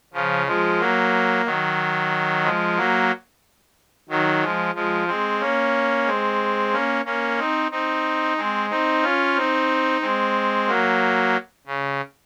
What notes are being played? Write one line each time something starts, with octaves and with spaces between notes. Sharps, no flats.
C#3 F3
F3 G#3
F#3 A#3
D#3 F#3
F3 G#3
F#3 A#3
D#3 F#3
F3 G#3
F3 G#3
G#3 C4
A#3 C#4
G#3 C4
A#3 C#4
A#3 C#4
C4 D#4
C4 D#4
G#3 C4
C4 D#4
C#4 F4
C4 D#4
G#3 C4
F#3 A#3
C#3